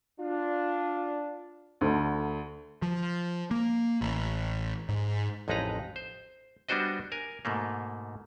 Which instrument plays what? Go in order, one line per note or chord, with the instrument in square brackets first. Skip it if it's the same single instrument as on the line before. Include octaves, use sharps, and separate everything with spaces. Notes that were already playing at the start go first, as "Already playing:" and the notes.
[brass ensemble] D4 F4
[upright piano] D2 D3
[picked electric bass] F3
A#3
A1
G#2
[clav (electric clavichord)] A1 F2 G#3 D#4 B4 A#5
C5
G3 B3 D4 F#4 C5 D#5
A#4 G#5
G#2 B2 A3 A#3